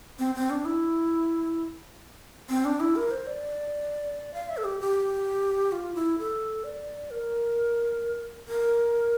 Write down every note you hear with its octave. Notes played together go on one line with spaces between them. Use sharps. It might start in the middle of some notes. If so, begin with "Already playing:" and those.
C4
C4
D4
E4
C4
D4
E4
A#4
C5
D5
F5
E5
A4
G4
G4
F4
E4
A4
D5
A#4
A#4